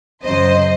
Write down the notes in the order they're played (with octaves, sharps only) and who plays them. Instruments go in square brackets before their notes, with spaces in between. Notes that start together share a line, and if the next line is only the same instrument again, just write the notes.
[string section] F#2 C#3 F#3 C5 D#5